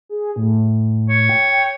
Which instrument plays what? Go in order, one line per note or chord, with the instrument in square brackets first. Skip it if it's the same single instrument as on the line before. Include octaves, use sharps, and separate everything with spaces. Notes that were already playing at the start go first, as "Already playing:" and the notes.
[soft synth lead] G#4
A2
[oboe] C#5
[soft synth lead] G5
G5